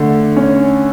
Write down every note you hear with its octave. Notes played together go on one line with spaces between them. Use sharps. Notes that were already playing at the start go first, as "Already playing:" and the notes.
Already playing: D3 A3
C#4